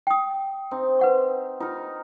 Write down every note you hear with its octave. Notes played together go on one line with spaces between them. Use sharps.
G5 D#6
C4 D#4
B4 F#5 C#6
D#4 F4 A#4